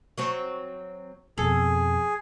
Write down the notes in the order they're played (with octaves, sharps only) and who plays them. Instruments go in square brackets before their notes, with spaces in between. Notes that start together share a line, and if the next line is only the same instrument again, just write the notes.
[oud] F#3 C4 C#5
[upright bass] F2 B2 [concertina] G#4 [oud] A4